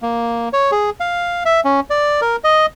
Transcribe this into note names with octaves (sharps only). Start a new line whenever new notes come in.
A#3
C#5
G#4
F5
E5
C#4
D5
A#4
D#5